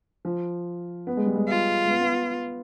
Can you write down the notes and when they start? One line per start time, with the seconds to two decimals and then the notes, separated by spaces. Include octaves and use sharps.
0.25 F3
1.07 B3
1.17 G#3
1.26 G3
1.36 G#3
1.49 F4
1.86 G#3
1.90 B3
2.01 B3